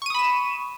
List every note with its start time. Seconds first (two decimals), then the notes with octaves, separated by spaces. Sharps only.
0.02 C#6
0.06 D#7
0.10 D#6
0.15 B5
0.19 E7